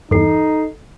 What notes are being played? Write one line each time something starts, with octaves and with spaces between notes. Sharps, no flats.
E2 G2 D#4 A4 C7